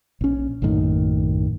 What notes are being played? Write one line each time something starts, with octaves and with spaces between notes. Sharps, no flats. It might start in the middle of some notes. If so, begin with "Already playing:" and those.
A#1 C#4
A#1 F#2 A2 D#3